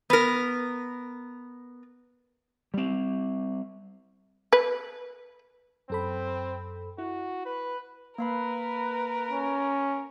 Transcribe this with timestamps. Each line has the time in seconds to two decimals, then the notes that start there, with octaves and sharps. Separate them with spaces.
0.10 B3 A#4
2.74 G3 C4
4.53 B4
5.90 F#2 C4 A4 B5
6.98 E4 F#4
7.45 B4
8.18 A#3 A#4 B4 F5 B5
9.31 C#4